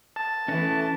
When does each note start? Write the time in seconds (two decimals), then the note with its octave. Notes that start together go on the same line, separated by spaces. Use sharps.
0.16 A5
0.48 E3 A3 C#4 B4 D#5